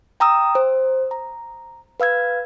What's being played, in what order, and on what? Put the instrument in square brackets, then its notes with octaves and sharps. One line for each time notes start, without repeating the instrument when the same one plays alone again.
[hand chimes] G5 A#5 D#6 E6
C5
A#5
B4 F5 E6 G#6